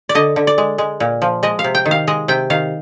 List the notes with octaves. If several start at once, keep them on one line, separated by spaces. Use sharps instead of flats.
D5
D3 D#5
D3
D5
G#3
G#3
A#2
F3
G#3 D#5
F5
C3
G5
D#3
F5
G#3 D#5
C3 G5
D#3 F5